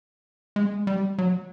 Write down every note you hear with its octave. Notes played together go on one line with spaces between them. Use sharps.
G#3
G3
F#3